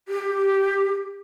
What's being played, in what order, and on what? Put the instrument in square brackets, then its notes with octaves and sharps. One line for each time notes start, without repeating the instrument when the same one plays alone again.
[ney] G4